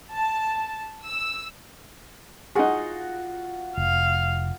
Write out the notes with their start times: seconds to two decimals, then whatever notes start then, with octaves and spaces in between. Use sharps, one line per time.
0.14 A5
1.03 E6
2.55 D#4 F4 F#4 G#4 F#5
3.77 F1 F5